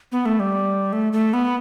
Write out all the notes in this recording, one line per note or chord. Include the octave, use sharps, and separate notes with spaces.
B3
A3
G3
A3
A3
B3